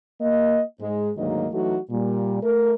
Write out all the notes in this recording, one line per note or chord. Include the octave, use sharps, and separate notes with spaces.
A#3 D#5
G#2 G#3
D2 G#2 D#3 F#3 A#3 D#5
E3 F#3 A3 D#4 F#4
A#2 G3
A3 A#4